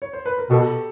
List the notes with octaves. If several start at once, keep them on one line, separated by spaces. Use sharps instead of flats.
C#5
C5
B4
A#4
B2 G4 A4